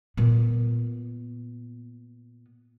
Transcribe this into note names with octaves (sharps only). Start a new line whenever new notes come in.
A#2 B3